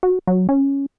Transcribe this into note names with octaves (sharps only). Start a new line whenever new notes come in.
F#4
F#3
C#4